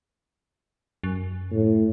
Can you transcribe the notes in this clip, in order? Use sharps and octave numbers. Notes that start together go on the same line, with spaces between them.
F#2
A2